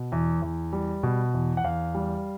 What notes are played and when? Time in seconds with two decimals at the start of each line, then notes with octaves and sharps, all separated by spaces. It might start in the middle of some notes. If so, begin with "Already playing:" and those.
Already playing: B2
0.12 E2
0.42 E2
0.73 G3
1.03 B2
1.34 E2
1.57 F#5
1.64 E2 F5
1.95 G3